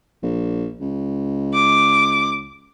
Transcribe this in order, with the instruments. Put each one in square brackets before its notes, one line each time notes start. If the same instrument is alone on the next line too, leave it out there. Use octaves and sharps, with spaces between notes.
[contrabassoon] A#1
C#2
[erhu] D6